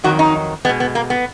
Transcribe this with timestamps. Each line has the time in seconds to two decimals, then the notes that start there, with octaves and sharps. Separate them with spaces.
0.04 F2 D#3 F#3 F#4
0.19 D#4
0.65 B2 G#3 B3
0.80 B3
0.95 A#3
1.10 B3